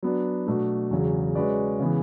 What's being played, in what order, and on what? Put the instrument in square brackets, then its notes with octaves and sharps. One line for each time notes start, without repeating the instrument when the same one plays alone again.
[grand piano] F#3 B3 D4
B2 F#3 A3 D4
E2 C#3 F#3
G#3 C#4 F#4 B4 D5
C#3 E3 B3